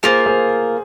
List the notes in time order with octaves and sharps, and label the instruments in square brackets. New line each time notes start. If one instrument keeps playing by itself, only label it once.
[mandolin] A#3 F4 A#4 [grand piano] G#4 C5
[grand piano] G#4 C5